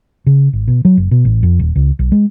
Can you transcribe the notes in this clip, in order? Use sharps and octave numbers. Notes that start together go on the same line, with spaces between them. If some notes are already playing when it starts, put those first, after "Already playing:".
C#3
G#1
B2
F#3
F#1
B2
A1
F2
D#1
C#2
B1
G#3